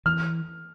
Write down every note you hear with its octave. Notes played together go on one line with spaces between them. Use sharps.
E3 F6